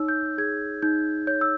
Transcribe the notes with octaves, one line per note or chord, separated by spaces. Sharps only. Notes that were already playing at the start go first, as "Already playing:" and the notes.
Already playing: D#4 C#5 E6
G6
G#4 G#6
D#4 G6
C#5 G6
E6